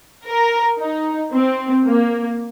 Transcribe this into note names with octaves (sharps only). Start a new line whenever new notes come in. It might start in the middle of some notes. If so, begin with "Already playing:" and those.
A#4
D#4
C4
A#3